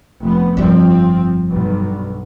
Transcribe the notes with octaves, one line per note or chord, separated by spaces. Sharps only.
F1 B3
G1 F2 F3 G3 C4
B1 G2